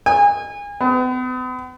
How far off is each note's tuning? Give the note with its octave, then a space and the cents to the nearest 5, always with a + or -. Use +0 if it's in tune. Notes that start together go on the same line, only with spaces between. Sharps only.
G#5 -30
B3 +45